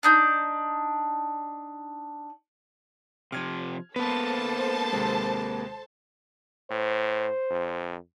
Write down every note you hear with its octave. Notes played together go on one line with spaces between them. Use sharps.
D4 D#4 G6
C3 F3 F6 G#6
A#3 B3 A4 B4 C5 A5
D#2 C3 G#3
A2 C5
F2